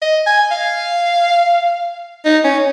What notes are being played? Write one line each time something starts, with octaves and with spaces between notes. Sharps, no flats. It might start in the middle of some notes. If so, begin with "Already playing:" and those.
D#5
G#5
F5
D#4
C#4